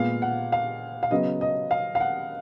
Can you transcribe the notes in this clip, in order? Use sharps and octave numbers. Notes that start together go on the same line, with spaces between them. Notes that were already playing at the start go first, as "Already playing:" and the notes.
Already playing: A#2 G#3 B3 F5
F#5
F5
F5
C#3 F#3 B3 D#5
D#5
F5
F5
F#5